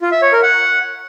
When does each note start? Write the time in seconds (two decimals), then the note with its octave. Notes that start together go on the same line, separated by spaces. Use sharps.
0.01 F4
0.12 E5
0.22 C#5
0.32 A#4
0.43 F#5